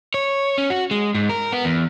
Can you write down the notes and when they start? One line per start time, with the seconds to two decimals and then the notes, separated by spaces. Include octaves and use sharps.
0.14 C#5
0.58 C#4
0.70 F#4
0.91 G#3
1.15 G#2
1.29 A#4
1.52 B3
1.65 E2